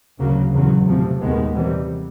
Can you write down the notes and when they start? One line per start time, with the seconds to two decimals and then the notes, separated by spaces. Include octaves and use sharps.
0.19 D2 C#3 F#3 A#3
0.53 E2 C#3 F#3
0.86 C3 F3 A3
1.21 D#2 D#3 G#3 B3
1.54 C3 E3 G3